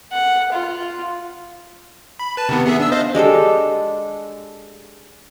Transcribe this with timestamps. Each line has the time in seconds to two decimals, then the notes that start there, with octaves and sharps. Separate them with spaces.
0.12 F#5
0.52 F4
2.19 B5
2.37 B4 A5
2.49 C3 D#3 B3
2.65 B3 G#4 E5
2.80 D4 E6
2.92 C5 D#5 F5
3.15 G#3 D4 G4 A4